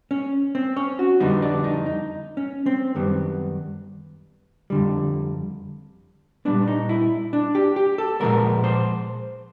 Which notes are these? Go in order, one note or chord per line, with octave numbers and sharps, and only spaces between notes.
C#4
C4
C#4
F#4
F2 D3 G3 B3 D#4
D4
D#4
D#4
C#4
C4
F#2 D#3 G3 B3
F2 D3 G3
A#2 G3 B3 D4
D#4
E4
D4
G4
G4
A4
A#2 F3 G#3 B3 A#4
C5